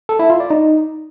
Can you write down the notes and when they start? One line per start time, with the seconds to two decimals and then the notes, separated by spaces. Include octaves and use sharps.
0.09 A4
0.19 E4
0.30 F4
0.40 D5
0.50 D#4